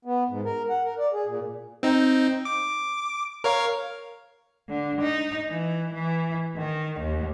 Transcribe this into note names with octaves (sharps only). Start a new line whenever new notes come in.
B3
G#2
A#4
F#5
A#4
D5
G#4
A#2
C4 D#4
D6
A#4 C#5 F5
D3
D#4
E3
E3
D#3
D#2